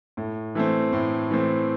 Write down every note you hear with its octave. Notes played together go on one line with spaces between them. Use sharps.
A2
E3 A3 C4
A2
E3 A3 C4